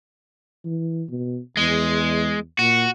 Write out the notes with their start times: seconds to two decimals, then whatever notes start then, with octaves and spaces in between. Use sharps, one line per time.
0.65 E3
1.10 B2
1.57 E2 G#3
2.59 A#2 F#4